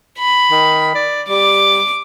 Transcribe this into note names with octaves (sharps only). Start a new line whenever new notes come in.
B5
D#3
D5
G3 D6